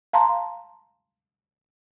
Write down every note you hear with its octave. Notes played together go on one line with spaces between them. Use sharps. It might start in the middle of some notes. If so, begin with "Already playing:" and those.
F5 A5 A#5 C6